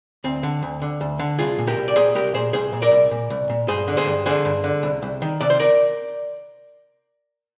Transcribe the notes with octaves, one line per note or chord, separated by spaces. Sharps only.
D2 C4
D3
D2
D3
D2
D3
C2 F4 G#4
A#2
G4 A#4
C2
D5
A#2 G#4 C5
C2 G4 A#4
A#2 G#4 C5
C2 G#4 C5
A#2
A#4 D5
C2
A#2
C2
A#2
G2 G#4 C5
D3
G#4 C5
G2
D3 G#4 C5
G2
D3
C2
C2
D#3
C3 D5
C5
A#4 D5